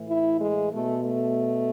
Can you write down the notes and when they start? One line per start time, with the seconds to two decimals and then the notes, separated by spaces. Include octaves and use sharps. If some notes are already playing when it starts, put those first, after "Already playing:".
Already playing: A2 E3
0.09 E4
0.41 G#3
0.73 B2 A3
1.05 A3